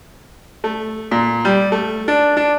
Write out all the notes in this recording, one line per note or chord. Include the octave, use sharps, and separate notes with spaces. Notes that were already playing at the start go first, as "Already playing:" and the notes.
A3
A#2
G3
A3
D4
D4